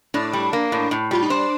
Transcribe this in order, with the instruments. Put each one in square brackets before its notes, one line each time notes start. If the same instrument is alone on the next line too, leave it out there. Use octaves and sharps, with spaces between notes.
[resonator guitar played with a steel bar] A2 [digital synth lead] D4
[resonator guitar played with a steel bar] G3
A#3
A2
A2
[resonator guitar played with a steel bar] G3 [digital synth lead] F4
[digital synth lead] D#4
[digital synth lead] D4 [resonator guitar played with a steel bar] C5